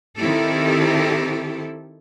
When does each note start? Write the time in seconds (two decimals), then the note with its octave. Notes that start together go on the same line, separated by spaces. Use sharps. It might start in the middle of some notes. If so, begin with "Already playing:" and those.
0.18 D#3 C4 E4 G4 A4